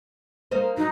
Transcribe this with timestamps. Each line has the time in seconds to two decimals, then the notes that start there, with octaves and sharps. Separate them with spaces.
0.51 A#3 D#4 C5
0.77 F#3 D#4